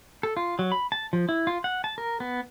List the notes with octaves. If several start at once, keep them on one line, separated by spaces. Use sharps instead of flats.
A4
F4
F#3
B5
A5
F3
E4
F4
F#5
A5
A#4
B3